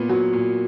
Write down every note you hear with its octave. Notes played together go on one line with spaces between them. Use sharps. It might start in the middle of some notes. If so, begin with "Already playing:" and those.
Already playing: A#2 B3
F#3
A#2